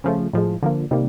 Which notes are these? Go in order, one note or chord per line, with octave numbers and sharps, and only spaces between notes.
C#3 F3 A3
A2 F3 G#3
D3 F3 A#3
C3 D#3 G3 A#3